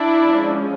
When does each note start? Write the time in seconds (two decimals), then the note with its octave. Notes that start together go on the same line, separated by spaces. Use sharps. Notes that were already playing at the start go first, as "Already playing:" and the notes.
Already playing: D4 E4
0.26 F3 G#3 C#4